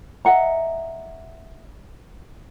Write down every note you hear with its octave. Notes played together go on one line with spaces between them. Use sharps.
D#5 E5 F#5 A#5